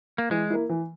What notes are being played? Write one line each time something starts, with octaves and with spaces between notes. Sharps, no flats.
A#3
E3 G#3
A#3 E4
E3